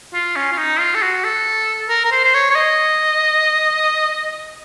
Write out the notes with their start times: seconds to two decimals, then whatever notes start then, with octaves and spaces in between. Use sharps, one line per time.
0.14 F4
0.36 C#4
0.52 F4
0.58 D#4
0.80 F4
0.95 A4
1.02 F#4
1.24 A4
1.89 A#4
2.05 A#4
2.12 C5
2.25 C5
2.34 C#5
2.51 C#5
2.56 D#5